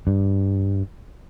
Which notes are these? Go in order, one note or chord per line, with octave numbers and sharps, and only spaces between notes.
G2